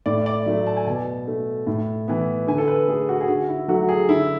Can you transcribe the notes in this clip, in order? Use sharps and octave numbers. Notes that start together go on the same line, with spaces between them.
A2 D5
D5
F#3 A3 E5
A5
G#5
B2 A5
A3
A2
E3 B3
D3 G#5
A4
B4
A3 G#4
F#4
G#4
D3 F#4
E4
F#3 A3 F#4
G#4
D3 E4